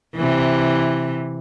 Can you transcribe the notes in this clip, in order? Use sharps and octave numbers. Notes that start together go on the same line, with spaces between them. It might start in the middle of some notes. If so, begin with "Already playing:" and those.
C3 E3